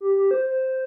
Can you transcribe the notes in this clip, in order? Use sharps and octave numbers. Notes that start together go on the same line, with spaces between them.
G4
G4
C5
C5